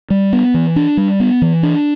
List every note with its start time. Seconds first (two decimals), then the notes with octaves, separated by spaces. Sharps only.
0.10 G3
0.33 B3
0.54 E3
0.76 D4
0.97 G3
1.20 B3
1.42 E3
1.63 D4